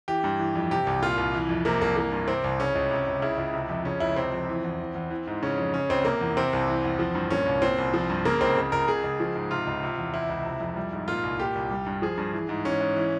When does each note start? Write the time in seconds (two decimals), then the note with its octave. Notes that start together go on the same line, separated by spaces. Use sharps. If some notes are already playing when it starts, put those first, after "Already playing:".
0.08 E3 G4
0.24 G2
0.39 E3
0.56 F2
0.71 C3 G4
0.87 C2
1.02 A#2 F4
1.18 C2
1.34 E3
1.49 F2
1.65 C3 A#3
1.81 C2 A#3
1.96 E3 A#3
2.12 G2
2.28 C3 C4
2.44 C2
2.60 C#3 C#4
2.75 C#2
2.91 C3
3.07 C#2
3.22 C#3 E4
3.38 C#2
3.54 C3
3.69 F2
3.85 C#3 C#4
4.00 C#2 E4
4.16 C3 C4
4.33 F2
4.49 E3
4.64 E2
4.79 E3
4.95 E2
5.10 E3
5.27 G#2
5.42 C#3 C#4
5.58 F2
5.74 C#3 C#4
5.90 C#2 C4
6.05 C3 A#3
6.21 E2
6.37 C3 C4
6.53 C2
6.68 E3
6.84 E2
6.99 F3
7.15 G2
7.30 A#2 C#4
7.46 C2
7.62 A#2 C4
7.78 C2
7.94 F3
8.10 G2
8.25 C#3 A#3
8.41 C#2 C4
8.57 C#3
8.72 C#2 A#4
8.88 C#3 G#4
9.04 C#2
9.20 F3
9.36 G#2
9.51 C3 F4
9.67 C#2
9.83 C3
9.98 E2
10.14 C3 E4
10.29 C#2
10.45 C3
10.60 F2
10.76 G3
10.93 G#2
11.08 A#2 F4
11.23 C2
11.40 A#2 G4
11.55 C2
11.71 G3
11.86 G2
12.02 F3 G#4
12.17 G2
12.33 E3
12.49 G#2
12.65 E3 C#4
12.81 G#2
12.96 E3